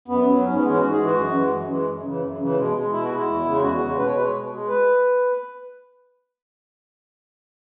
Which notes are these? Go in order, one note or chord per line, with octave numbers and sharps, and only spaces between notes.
F#2 B3
F#3
G#2 C#4
B3
E3 G#3 C#4
G#2 F#4
G#4
E3 G#3
F#4
F#2
E3 G#3
F#2
E3 G#3
F#2
C#3 E3
F#2
C#3 E3
B2 G#3
G#3
B2 E4
F#4
G#3
E4
E2
C#3 G#3
E2 F#4
C#3 G#3
B2 B4
C#5
G#3 B4
C#5
B2
G#3
B4